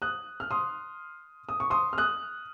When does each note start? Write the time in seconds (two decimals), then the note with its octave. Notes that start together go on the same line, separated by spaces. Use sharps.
0.02 D#6 F#6
0.40 F6
0.51 C6 D#6
1.49 D#6
1.60 C#6
1.70 C6 D#6
1.93 F6
1.98 D#6 F#6